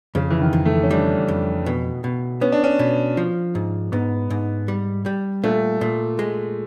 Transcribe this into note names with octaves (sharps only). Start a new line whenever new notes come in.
F2 C#3
E3
D#3
F2
A3
C#4
G3 D4
F2
B2
B2
B3 C#4
D4
C#4
B2
F3
G#2
G#2 B3
G#2
G3
G3
A#2 A3
A#2
G#3